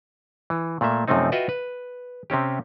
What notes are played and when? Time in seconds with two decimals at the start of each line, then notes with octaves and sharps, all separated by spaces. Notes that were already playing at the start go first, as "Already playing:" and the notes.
0.50 E3
0.81 A#2 A3 A#3 E5
1.08 F#2 C3 F3 A3 C4 D#4
1.32 F4 F#4 B4 D#5 E5 G5
1.49 B4
2.30 C3 C4 C#4 G4